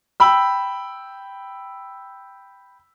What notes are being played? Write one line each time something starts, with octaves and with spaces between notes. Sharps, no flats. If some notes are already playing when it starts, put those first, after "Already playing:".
G5 B5 E6